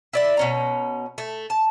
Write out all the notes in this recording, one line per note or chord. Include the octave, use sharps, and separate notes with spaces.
E4 D5 E5
B2 C#4 A#5
A3
A5